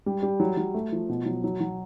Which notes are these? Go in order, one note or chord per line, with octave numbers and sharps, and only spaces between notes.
G3
G3
F#3
F#3
A3
F3
B2
F#3
F#3
F#3